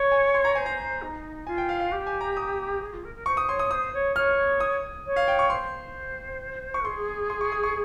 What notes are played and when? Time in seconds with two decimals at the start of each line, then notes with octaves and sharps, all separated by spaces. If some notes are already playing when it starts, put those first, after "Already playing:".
Already playing: C#5
0.12 G#5
0.35 C6
0.45 A#5
0.55 C5 G#5
0.66 A#5
1.02 D#4
1.47 F4 G#5
1.58 G5
1.69 F5
1.80 F5
1.91 G4
2.07 G#5
2.21 A#5
2.37 D#6
2.81 G#4
2.92 F4
3.04 A#4
3.14 A#4
3.26 C5 C#6
3.37 D#6
3.48 C#5 C6
3.59 D#6
3.71 C5 D#6
3.93 C#5
4.16 C#5 F6
4.60 D#6
5.06 C#5
5.16 F5
5.28 G5
5.39 C#6
5.50 C5 C6
6.74 C#6
6.85 G#4 C6
7.30 C6
7.41 C#6
7.52 D#6
7.63 C#6